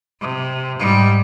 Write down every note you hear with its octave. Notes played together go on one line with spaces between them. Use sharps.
C3
G#2 G3